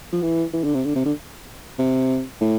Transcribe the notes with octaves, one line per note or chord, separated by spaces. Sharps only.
F3
E3
E3
D3
C3
D3
C3
D3
C3
A2